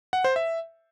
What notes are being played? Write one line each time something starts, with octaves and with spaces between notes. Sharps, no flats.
F#5
C5
E5